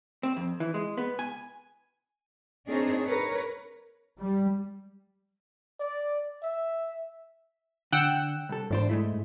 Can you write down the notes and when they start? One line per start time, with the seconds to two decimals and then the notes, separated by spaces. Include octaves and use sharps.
0.23 C4
0.37 F2
0.60 E3
0.74 G#3
0.98 B3
1.19 G#5
2.68 C4 D4 D#4 G#4 A#4 C#5
3.04 A#4 B4 C#5
4.18 G3
5.80 D5
6.43 E5
7.92 D3 F#5 G5 E6
8.49 C2 A4
8.71 E2 G#2 D4 C5
8.89 G#3 A3 E4